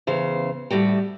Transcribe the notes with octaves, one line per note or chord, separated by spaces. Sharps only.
E2 C#3 C5 F5
A2 G3 F#4 G4